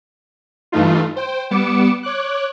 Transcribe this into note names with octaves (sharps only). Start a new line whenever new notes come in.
G2 E3 A3 D#4 F4
C5 G5
G3 B3 D6 C#7 E7
C#5 D6 F#6